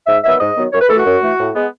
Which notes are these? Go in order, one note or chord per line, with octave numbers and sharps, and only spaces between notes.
G#2 E5
D#3 F#3 B3 E5
G#2 D#5
D#3 F#3 B3
F#2 C#5
B4
E3 A3 A4
F#4
F#2
E3 A3
A2
G#3 B3